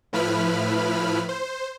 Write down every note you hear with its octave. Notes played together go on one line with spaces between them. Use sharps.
A2 F3 E4 B4 B5 F6
C5